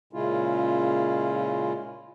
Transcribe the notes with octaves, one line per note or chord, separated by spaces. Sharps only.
A#2 C#3 G#3 C#4 E4 F4